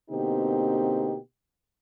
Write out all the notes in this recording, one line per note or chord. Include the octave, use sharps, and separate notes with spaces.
B2 D3 A#3 C4 D#4 G4